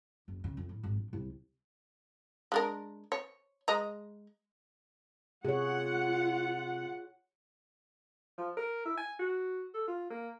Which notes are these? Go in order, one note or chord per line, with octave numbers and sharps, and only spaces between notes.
F#1
C#3
F2
A2
G#1
A#1
C2
G#3 D4 A#4
C#5
G#3 D#5 A#5
C3 F4 G#4 C#5 F#5
F3
A#4
E4
G#5
F#4
A4
F4
A#3